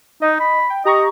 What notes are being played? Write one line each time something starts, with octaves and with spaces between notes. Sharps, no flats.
D#4 D#5
B5
G5
G4 D#5 A#5 C#6